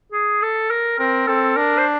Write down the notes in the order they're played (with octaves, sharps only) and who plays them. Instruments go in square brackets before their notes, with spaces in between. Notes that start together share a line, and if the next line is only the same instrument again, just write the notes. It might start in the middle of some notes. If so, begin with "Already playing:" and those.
[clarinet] G#4
A4
A#4
[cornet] C4 [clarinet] A#4
[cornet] C4 [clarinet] A4
[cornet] D4 [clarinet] A#4
[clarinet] C5